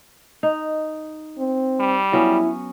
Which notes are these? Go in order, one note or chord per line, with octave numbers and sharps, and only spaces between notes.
D#4
C4
G3
F#3 B3 C#4 E4